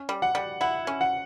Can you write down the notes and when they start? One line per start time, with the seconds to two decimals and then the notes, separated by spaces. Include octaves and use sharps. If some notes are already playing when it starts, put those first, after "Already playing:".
Already playing: C#4
0.09 G3
0.22 F#5
0.35 G3
0.61 E4 F#5
0.87 C#4
1.01 F#5